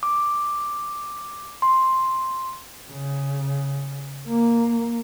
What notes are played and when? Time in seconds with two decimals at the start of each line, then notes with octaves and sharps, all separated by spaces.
0.03 D6
1.62 C6
2.89 C#3
4.28 A#3